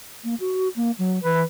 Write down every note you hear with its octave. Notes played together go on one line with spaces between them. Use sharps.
A#3
F#4
A#3
F#3
E3 B4